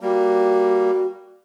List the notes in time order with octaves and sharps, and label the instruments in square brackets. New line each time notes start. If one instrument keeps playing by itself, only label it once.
[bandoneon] G3 A#3 [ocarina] F#4